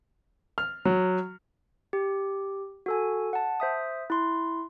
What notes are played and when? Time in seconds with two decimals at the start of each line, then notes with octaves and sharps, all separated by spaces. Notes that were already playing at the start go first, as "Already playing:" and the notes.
0.58 F6
0.85 F#3
1.93 G4
2.86 F#4 A4 G#5
3.33 F#5 A5
3.60 C5 E5 D#6
4.10 E4 C6